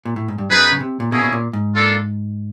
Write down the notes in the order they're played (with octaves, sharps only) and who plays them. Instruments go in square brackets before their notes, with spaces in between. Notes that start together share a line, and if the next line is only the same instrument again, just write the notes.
[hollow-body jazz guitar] A#2
A2
G#2
G2
[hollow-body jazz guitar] F#2 [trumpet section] B3 D#4 G#4 B4
[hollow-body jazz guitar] C#3
C3
A#2
[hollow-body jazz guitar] B2 [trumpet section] A#3 C#4 E4 G#4
[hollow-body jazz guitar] B2
A#2
G#2
[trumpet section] A#3 D4 F4 A4